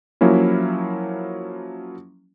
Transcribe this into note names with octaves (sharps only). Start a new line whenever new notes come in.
F3 F#3 A#3 C#4 E4